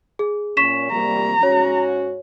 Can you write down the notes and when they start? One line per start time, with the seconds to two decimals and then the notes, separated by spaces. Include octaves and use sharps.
0.19 G#4
0.57 A#2 C#4 C#6 B6 E7
0.92 C3 G3 A#3 A#5
1.43 G#2 C#4 F#4 C#5